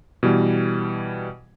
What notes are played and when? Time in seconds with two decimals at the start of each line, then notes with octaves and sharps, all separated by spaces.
0.23 B2 E3 G3